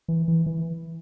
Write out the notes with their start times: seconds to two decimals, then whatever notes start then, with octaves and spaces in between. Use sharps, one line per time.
0.08 E3
0.28 E3
0.46 E3